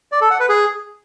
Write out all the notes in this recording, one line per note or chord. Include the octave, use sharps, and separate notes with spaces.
D5
A4
F#5
B4
G#4